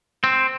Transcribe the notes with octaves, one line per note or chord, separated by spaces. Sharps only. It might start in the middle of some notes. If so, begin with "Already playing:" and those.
C4